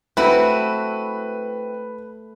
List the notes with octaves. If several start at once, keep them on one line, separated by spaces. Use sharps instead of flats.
A3 C4 E4 F#4 B4